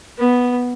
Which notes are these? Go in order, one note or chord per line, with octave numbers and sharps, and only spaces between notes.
B3